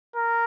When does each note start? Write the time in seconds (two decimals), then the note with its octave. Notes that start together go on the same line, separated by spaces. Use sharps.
0.15 A#4